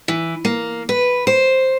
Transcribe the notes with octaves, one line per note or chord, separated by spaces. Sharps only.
E3
A#3
B4
C5